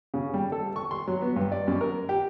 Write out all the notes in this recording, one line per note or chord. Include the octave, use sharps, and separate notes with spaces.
C#3
G3
A4
C#6
C6
F#3
B3
G2
D5
F#2
A#4
G4